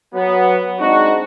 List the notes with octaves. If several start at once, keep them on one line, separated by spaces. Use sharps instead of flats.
F#3 B3
G#3 C4 D4 D#4 F#4